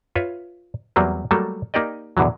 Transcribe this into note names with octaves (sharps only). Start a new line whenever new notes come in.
F4 B4 C#5 E5
E2 F#3 G3 A#3 C4
F#3 G3 A3 A#3 A4
A#3 D#4 G4 D5 D#5
E2 B2 D3 E3 F#3